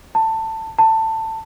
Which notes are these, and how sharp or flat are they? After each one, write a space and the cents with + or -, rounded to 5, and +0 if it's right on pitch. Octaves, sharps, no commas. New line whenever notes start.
A5 +15
A5 +15